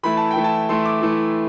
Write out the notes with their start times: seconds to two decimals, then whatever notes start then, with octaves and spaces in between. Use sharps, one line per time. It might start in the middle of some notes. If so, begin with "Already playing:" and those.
0.03 E3 A3 E4 B5
0.17 A5
0.31 G5
0.36 E3 A3 E4
0.44 A5
0.69 E3 A3 E4 C6
0.85 D6
1.01 E3 A3 E4